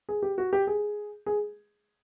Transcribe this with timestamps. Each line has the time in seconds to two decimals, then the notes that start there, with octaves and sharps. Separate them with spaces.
0.09 G#4
0.22 G4
0.38 F#4
0.53 G4
0.67 G#4
1.26 G#4